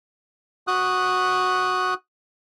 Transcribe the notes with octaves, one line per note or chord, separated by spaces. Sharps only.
F#4 D#6 F#6